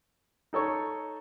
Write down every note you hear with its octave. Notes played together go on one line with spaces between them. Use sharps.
D#4 A4 C#5 C#6